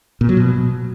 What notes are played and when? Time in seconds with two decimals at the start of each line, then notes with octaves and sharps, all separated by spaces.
0.21 A#2
0.29 F#3
0.37 B2